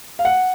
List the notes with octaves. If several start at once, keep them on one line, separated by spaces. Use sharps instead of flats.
F5
F#5